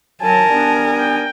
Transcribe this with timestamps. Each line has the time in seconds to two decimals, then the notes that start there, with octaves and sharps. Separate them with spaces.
0.22 F#3 A#4 G#5 A5
0.50 G3 B3 D4
1.00 G5